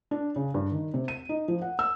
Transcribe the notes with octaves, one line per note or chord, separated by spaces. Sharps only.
D4
C#3
G2
D#3
C3
D#7
D#4
F3
F#5
E6